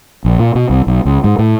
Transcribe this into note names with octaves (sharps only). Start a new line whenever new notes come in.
A#1
A#2
B2
C2
B1
C#2
G#2
A2